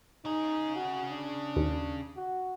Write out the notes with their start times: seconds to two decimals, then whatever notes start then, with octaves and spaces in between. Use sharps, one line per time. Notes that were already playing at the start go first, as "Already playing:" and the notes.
0.25 C#3 D#4 G#4
0.75 F#4
1.11 D4
1.56 D#2
2.17 F#4